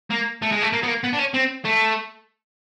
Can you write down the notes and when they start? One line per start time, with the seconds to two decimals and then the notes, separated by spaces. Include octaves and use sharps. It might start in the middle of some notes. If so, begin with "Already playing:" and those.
0.11 A#3
0.42 A3
0.52 G#3
0.63 A3
0.73 A#3
0.83 B3
0.88 A#3
1.04 B3
1.13 D4
1.19 C#4
1.34 C4
1.65 A3